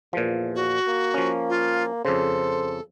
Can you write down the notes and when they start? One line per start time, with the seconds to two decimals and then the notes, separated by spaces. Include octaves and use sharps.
0.13 E2 A#2 F3
0.55 F#4
0.87 A#3
1.14 F3 C#4
1.49 F4
2.05 F2 C#3 A4 C5